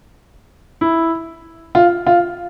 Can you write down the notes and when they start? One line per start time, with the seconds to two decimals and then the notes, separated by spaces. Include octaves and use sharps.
0.81 E4
1.75 F4
2.07 F4